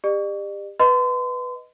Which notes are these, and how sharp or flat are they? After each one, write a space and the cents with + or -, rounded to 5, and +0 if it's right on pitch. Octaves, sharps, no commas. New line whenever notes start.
G4 +30 D5 +45
B4 +0 D#5 +0 C6 -35